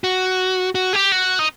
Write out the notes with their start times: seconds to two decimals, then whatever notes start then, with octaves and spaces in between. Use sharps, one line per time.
0.04 F#4
0.75 F#4
0.93 G4
1.12 F#4
1.39 D#4